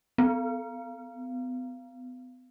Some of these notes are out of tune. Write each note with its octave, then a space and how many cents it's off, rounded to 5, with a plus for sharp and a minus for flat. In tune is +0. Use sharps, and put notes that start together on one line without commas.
B3 +40